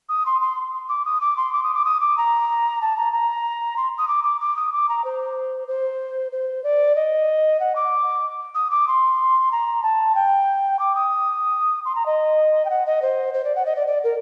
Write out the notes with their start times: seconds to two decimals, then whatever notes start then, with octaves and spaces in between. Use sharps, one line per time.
0.09 D#6
0.26 C6
0.41 C6
0.89 D6
1.05 D#6
1.21 D6
1.37 C6
1.53 D6
1.63 D#6
1.74 D6
1.85 D#6
2.00 D6
2.18 A#5
2.81 A5
2.97 A#5
3.13 A#5
3.77 C6
3.98 D#6
4.08 D6
4.24 D6
4.41 D6
4.56 D#6
4.72 D6
4.89 A#5
5.04 C5
5.68 C5
6.32 C5
6.64 D5
6.96 D#5
7.60 F#5
7.76 D6
8.55 D#6
8.71 D6
8.88 C6
9.52 A#5
9.83 A5
10.15 G5
10.79 D6
10.95 D#6
11.85 C6
11.95 A#5
12.06 D#5
12.65 G5
12.70 F#5
12.86 D#5
13.02 C5
13.34 C5
13.44 D5
13.56 F#5
13.66 D#5
13.76 D5
13.87 D5
14.04 A#4